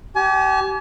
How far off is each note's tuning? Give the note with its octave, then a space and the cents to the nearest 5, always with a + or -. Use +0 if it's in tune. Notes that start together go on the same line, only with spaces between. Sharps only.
G4 -30 G#5 +35